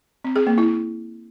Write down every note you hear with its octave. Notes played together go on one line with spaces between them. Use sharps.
C4
G#4
A#3
E4